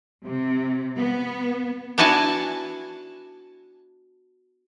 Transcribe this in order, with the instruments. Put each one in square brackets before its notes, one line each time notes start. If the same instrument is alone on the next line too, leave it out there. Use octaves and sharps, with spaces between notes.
[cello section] C3
B3
[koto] B3 D4 E4 F#4 G#5 A5